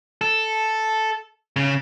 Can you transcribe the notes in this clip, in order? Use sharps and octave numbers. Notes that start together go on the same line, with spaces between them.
A4
C#3